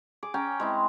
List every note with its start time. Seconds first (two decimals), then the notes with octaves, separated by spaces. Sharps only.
0.23 G#4 D6
0.34 C#4 G5 A#5
0.60 G#3 C4 E4